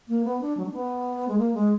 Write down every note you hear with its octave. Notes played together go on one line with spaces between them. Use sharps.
A#3
B3
D4
F#3
D4
B3
G#3
A#3
G#3